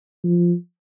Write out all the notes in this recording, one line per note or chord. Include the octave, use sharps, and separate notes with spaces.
F3